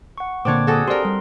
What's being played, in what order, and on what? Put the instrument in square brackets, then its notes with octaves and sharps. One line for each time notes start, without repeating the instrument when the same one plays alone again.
[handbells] F#5 C#6
[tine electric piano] A#2 D3 A#3 [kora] C4 D4 C#5 [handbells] D6 G#6
[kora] F#4 A4 [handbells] G#4 G#5 D#6
[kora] C4 A#4 [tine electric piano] G4 D5 [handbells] C6
[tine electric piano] G3